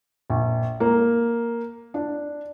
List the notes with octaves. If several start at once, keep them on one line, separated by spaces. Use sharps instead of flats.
A#1
A#3
D4